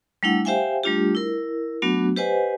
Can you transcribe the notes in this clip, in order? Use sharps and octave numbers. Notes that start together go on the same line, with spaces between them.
G3 A3 D4 E4 F#5
G4 C5 E5 F5 G5 G#5
G3 A3 D4 F4 G4
E4 A#4
F#3 A3 B3 D4 F#4
G4 B4 C5 D#5 F#5 G#5